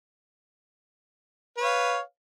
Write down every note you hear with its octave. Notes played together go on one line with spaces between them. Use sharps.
B4 C#5 F5